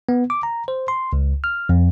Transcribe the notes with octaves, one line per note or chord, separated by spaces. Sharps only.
B3
D6
A#5
C5
C6
C#2
F6
F2